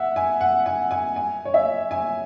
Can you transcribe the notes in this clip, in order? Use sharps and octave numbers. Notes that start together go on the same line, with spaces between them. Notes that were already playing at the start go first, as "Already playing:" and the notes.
Already playing: E5 F#5
G#5
F#5
G#5
G#5
G#5
C#5
E5
G#5